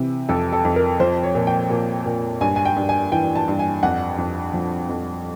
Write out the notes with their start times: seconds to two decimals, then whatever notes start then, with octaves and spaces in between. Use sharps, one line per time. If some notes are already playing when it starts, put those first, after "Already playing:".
Already playing: C3 E3
0.29 F2 A4
0.52 A4
0.65 F2
0.76 A#4
1.00 F3 C5
1.23 C#5
1.35 A#2
1.47 G5
1.70 A#2
2.06 A#2
2.41 G2 G#5
2.56 G#5
2.65 G5
2.76 G2
2.89 G#5
3.12 E3 G5
3.35 A5
3.48 G2
3.59 G#5
3.83 F2 F#5
4.18 F2
4.54 F3
4.89 F2